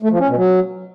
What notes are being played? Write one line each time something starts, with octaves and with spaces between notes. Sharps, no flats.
A3
F3
C#4
B2
F#3